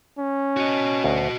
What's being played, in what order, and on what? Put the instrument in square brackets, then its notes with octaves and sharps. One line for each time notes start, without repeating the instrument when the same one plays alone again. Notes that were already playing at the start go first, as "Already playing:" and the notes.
[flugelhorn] C#4
[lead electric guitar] F#4 D#5
[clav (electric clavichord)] D2